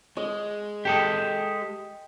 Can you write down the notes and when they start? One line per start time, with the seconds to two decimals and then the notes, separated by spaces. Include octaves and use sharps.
0.17 G#3 D#5
0.85 G4 A4 D#5 G5